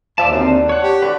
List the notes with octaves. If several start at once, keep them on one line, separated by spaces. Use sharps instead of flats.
D#2 F3 D5 E5 A5
F#2 D3 C4
D4
C#5 F#5
G4
D3 F#4 B4